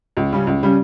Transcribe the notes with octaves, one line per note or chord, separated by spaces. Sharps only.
C#2
C#3 G3 C#4
C#2
C#3 G3 C#4